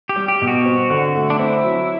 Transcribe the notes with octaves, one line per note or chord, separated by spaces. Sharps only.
G4
G3
G4
B2
F#4
C4
D3
A3
D4
C4 E4
F#3